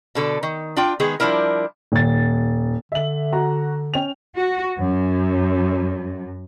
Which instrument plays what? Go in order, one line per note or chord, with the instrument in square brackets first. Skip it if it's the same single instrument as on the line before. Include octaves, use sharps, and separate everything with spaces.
[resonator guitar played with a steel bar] B2 D3 A4
D#3
D4 F4 G5
D#3 G#3 B3 G#4
F3 G3 D4 E4 A#4
[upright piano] D#1 A6
[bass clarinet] D3 [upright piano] E5 F#7
[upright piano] F#4 A#5
C#4 G5 F7
[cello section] F#4
F#2